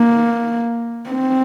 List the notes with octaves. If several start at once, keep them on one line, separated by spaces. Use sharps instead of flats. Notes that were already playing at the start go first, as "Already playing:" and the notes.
Already playing: A#3
C4